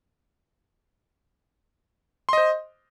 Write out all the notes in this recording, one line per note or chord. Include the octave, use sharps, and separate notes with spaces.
C5 D#5 C6